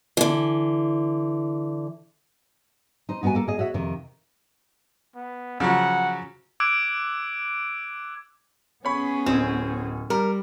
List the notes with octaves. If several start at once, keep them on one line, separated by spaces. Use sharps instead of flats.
D3 E3
D#4 C5
B3 D#4 F#4 A#4 G#5
A#3 A4 A#4
G#4 D#5
F#4 C#5 E5
F2 C3 D#3
B3
C#3 F3 F#3 F#5
D6 E6 F#6 G#6 D7
B3 C#4 G#4 C#5 B5
D1 C4 D#4
G3 A#4